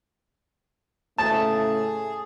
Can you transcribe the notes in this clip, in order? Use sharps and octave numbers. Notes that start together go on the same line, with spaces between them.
A2 C#3 A3 G#4 A5